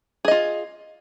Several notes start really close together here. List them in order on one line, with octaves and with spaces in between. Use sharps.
G#4 D#5 F4